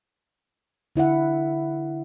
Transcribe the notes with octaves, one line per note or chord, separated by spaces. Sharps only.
D3 E4 E5 F#5